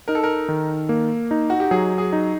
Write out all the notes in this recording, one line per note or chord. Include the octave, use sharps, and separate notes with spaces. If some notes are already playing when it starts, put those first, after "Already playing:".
D#4 A#4
A4
A#4
D#3
A#3
D#4
F#4
G4
F#3 G#4
G#4
D#4